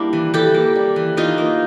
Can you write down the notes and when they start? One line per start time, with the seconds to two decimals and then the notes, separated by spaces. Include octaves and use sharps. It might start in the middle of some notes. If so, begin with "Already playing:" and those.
Already playing: G3 A#3 D4 E4
0.13 E3
0.34 E3 G4 A4
0.54 A#3
0.76 G3
0.96 E3
1.17 E3 D#4 F4
1.38 A#3